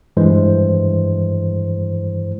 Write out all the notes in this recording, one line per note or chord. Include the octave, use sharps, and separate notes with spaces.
G2 E3 G#3 C5